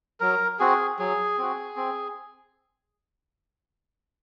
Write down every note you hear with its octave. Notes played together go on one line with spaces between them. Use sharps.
F#3 A#4
C4 F#4 G#4
F#3 G#4
C4 F#4
C4